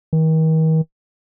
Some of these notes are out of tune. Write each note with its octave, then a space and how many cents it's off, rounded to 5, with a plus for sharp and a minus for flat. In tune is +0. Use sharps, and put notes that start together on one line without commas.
D#3 +40